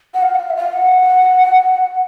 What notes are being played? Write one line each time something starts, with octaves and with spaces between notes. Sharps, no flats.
F#5
F5
F#5
F5
E5
F5
F#5